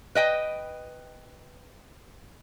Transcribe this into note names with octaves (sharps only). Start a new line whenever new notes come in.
B4 D#5 G5